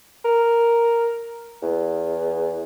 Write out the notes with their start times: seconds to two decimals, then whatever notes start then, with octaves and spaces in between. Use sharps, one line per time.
0.24 A#4
1.62 E2